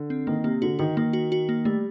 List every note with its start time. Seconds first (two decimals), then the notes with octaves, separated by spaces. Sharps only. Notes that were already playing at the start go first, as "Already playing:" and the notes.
Already playing: D3
0.10 C4
0.27 D#3 A#3
0.44 C3 A#3
0.62 D3 F#4
0.79 D#3 F#4
0.97 D#3 A#3
1.13 F#4
1.32 F#4
1.49 A#3
1.65 G3 A3